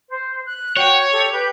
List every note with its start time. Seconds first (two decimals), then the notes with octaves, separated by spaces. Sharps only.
0.09 C5
0.46 F#6
0.77 F#4 C#5 G5
1.12 G4 A4
1.31 G4 B4 G6